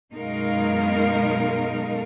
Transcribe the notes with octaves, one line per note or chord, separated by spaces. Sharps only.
F#2 B2 G#3 D#4 A#4 F5